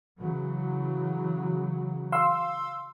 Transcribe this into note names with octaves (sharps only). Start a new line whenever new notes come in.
C#3 E3 F#3
F5 C6 E6